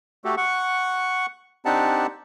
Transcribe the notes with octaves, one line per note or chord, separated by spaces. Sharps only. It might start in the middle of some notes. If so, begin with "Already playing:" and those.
A3 F#4 G4 A4
F#5 C#6
C4 D4 D#4 G4 F#5 A5